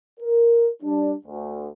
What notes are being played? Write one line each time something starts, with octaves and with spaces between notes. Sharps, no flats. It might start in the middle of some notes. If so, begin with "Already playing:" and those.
A#4
G3 D4
D2